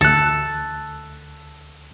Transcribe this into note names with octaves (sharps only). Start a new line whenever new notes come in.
D2 A4 F#6